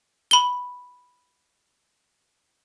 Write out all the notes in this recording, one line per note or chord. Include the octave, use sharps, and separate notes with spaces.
B5 G7